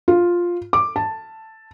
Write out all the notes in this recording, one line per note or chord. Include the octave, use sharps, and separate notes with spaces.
F4
D6
A5